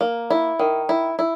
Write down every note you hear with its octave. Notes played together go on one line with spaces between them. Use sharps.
A#3
E4
D#3
E4
E4